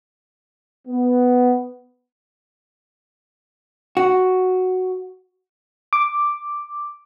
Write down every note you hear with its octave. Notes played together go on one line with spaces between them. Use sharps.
B3
F#4
D6